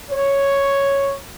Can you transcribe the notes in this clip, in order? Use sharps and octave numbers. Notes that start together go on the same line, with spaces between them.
C#5